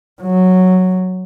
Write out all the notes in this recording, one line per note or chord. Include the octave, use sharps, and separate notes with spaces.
F#3